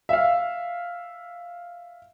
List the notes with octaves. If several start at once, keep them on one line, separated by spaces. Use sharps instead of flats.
E5 F5